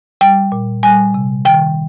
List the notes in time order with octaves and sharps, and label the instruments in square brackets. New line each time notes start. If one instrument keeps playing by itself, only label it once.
[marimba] G3 G5
A#2
G3 G#5
C3
D#3 G5